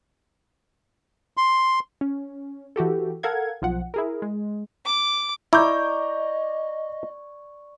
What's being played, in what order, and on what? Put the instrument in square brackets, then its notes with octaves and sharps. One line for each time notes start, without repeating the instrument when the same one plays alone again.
[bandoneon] C6
[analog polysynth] C#4
E3 F#4 G4 A4
A4 A#4 F5 F#5 G#6
B1 F3 F#5
E4 G#4 A#4
G#3
[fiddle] D6
[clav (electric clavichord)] E4 [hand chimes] D5 C#6 [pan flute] D#5 [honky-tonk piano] A#5 D6 G6